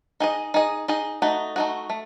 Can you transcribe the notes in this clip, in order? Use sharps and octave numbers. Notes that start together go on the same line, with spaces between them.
D#4 G#4 D#5
D#4 G#4 D#5
D#4 G#4 D#5
A3 D#4 F#4
A3 D#4 F#4
A3